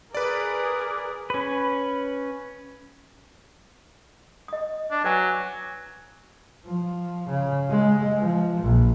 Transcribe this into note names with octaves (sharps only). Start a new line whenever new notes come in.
G#4 A#4 B4 D5 D6
C#4 B4
D#5 D#6
D4
F#3 B4 G#5
F3
C#3
G#3
F3
A#1